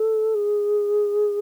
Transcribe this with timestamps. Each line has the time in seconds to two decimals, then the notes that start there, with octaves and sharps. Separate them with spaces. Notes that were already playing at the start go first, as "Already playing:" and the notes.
Already playing: A4
0.34 G#4